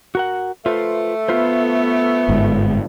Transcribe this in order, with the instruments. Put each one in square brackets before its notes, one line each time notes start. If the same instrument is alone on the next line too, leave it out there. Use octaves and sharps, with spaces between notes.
[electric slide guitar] F#4 A#4 F#5
[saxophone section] A3 [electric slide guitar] F4 B4 C5
[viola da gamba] B3 [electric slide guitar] F4 B4 C5
[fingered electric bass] G1 G#2